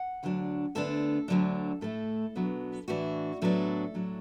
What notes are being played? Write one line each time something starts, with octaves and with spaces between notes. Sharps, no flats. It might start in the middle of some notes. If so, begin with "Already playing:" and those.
Already playing: F#5
D2 D3 F#3 D4
D2 D3 B3 D4 A4
D2 D3 F#3 D4
A2 A3 E4 A4
B2 F#3 B3 D4
A2 E3 D4 F#4
A2 F#3 B3 D4 A4
A2 F#3 D4